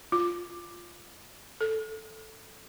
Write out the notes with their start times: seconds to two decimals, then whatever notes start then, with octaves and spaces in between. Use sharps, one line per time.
0.12 F4
1.61 A4